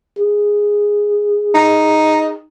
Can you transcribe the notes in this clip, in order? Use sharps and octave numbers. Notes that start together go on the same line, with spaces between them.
G#4
D#4